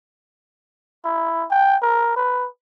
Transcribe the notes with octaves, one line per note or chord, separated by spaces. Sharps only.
E4
G5
A#4
B4